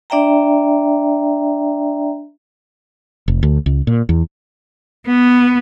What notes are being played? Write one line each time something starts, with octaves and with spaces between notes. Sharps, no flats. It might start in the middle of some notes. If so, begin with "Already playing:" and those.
D4 D5 E5 G5 A#5
F1
D2
C#2
A#2
E2
B3